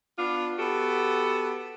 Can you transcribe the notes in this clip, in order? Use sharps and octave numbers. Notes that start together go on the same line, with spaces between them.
B3 D4 F4
B3 F#4 G4 A4